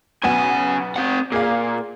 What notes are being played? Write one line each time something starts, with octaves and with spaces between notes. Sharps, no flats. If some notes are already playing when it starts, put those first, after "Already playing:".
B1 C#3 B3 G#5 E7
C4 F#5
A#2 G#4 F5